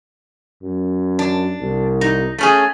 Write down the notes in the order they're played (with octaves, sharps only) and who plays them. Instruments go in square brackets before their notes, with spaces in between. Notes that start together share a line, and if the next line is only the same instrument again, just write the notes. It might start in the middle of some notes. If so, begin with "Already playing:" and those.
[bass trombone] F#2
[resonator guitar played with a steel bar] D4
[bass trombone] C2
[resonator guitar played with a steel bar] D#4
A3 C#4 G#4